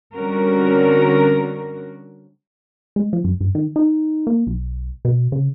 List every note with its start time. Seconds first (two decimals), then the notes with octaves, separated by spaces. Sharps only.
0.13 D3 G3 C4 C#4 F#4 A#4
2.96 G#3
3.13 F3
3.24 F#2
3.41 G2
3.55 D#3
3.76 D#4
4.27 A#3
4.47 B1
5.05 B2
5.32 C#3